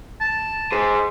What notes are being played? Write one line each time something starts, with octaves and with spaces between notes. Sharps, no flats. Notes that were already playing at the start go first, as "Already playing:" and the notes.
A5
G#4 C5